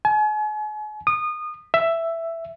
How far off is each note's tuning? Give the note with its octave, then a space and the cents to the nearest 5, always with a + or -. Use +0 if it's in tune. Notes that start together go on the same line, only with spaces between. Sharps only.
G#5 +40
D#6 -25
E5 +5